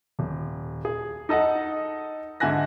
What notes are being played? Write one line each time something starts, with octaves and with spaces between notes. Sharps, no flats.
D#1
G#4
D#4 A4 D#5 F#5
G#2 D3 E5 G#5 F#6 A#6